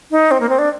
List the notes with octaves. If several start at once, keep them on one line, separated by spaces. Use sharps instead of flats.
D#4
C4
A#3
C4
D4